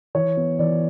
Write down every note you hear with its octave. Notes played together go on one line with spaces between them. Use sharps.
E3 C#5
B3
E3 D5